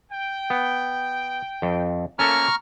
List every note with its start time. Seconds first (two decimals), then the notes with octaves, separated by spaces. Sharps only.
0.12 G5
0.50 B3
1.62 F2
2.19 F3 A3 A#3 C#4 A4 A#5 C#6 F6